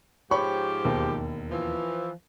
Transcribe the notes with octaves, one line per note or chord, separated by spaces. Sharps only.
G#2 F3 G4 C#5 B5 C#6
E1 D#2
E3 F3